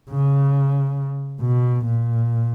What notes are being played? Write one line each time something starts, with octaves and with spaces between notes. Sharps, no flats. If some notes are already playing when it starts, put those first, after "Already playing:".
C#3
B2
A#2